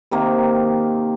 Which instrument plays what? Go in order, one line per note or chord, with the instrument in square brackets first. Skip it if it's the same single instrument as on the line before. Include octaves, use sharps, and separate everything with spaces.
[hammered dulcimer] C3 D#3 A#3 G4